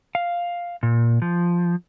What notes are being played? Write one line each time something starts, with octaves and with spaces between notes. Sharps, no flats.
F5
A#2
F3